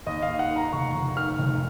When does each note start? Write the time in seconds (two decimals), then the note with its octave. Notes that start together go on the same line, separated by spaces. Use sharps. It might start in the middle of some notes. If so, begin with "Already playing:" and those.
0.06 D#2 D#5
0.22 F5
0.28 D#2
0.39 F#5
0.51 D#3
0.56 A#5
0.73 F1 C#6
0.94 F1
1.17 D#3 F6
1.39 F1